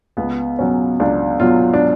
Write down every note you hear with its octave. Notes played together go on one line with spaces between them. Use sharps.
C#2 B3
B2 F#3 C#4
C#2 D4
B2 F#3 F4
D4